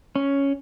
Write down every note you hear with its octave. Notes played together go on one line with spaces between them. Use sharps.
C#4